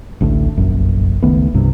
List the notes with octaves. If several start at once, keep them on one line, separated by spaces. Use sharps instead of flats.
A1 D2 A2
F1 A#1 F#2
C#2 D#3 A3 B3
C2 G2 C3